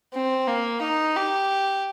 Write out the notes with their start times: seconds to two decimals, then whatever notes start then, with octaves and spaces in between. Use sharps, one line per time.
0.14 C4
0.48 A#3
0.82 D#4
1.16 G4